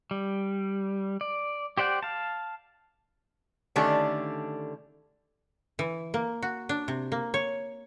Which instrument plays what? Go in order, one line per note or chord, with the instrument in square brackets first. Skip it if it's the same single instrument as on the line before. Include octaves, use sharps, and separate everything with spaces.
[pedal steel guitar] G3
D5
G4 C5 D5 F#5 G5
F5 A5
[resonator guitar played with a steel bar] D3 D#3 A3 C#4 D4 G4
[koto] E3
A#3
F#4
D4
C3
A#3
C#5